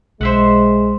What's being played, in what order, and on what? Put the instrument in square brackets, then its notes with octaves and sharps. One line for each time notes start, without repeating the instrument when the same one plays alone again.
[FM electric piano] B1 [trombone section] G#3 [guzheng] C5 E5 F#5